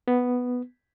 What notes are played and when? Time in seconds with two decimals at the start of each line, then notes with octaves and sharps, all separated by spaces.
0.08 B3